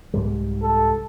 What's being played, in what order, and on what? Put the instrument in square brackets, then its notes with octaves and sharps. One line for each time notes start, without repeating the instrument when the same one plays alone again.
[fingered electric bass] C2 G#2 G3
[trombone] A4